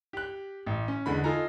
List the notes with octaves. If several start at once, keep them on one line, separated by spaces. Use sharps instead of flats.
G4 F#6
A1
C#4
E2 D3 G#3 B5
D#4 F4 A4 G#5 A#5